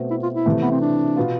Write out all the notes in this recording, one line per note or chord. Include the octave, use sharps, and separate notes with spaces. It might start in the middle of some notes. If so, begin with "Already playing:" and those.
Already playing: B2 A3 C4
E4
F4
E4
C3 E3 A3
B3
C4
D4
B2 B3 F4